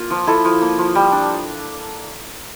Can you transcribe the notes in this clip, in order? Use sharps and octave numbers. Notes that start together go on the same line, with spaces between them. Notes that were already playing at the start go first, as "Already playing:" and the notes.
Already playing: A#3 F4
F3
E4 A4
F3
A#3
F3
G3
D4